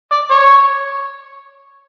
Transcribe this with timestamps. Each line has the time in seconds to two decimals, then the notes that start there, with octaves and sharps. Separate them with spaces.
0.12 D5
0.31 C#5